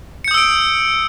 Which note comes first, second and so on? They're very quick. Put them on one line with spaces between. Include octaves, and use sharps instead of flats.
C#7 G6 D#6 E6 D7